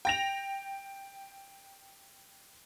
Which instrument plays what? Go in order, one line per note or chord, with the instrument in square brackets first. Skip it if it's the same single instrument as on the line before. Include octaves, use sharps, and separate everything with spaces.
[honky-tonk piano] G5 A#6 F7